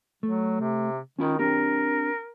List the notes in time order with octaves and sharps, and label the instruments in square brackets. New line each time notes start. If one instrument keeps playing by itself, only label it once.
[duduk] F#3 [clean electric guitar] A3
[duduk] C3
[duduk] D#3 [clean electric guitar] C#4 F4 B5
[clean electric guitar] C4 D4 G4 [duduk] A#4